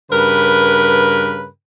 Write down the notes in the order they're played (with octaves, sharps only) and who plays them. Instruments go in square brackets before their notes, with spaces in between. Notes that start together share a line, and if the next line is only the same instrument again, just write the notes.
[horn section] G2 C#3 A#4 B4